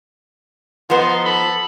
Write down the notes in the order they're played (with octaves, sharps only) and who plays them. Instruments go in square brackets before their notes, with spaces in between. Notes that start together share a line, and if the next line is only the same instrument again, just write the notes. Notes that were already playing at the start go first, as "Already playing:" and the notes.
[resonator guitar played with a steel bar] F3 B3 [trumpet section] D#4 C6
[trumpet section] A4 B5